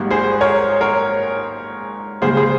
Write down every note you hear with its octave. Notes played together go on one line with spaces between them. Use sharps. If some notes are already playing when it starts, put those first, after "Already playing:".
Already playing: G#1 G#2 G3 A#3
G#4 C5
A#4 C#5
A#4 C#5
C#2 C#3 G3 A#3 G#4 C5
G#4 C5